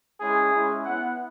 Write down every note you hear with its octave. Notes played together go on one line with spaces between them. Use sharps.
G#3 C#4 E4 G#4
G#3 C#4 E4
B3 E4 F#5